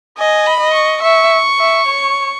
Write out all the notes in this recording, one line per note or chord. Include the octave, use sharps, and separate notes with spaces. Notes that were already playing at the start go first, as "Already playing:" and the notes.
D#5 G#5
B5
D#5
C#6
E5 C#6
E5
C#5